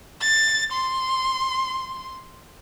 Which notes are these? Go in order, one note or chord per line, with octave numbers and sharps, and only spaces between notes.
A6
C6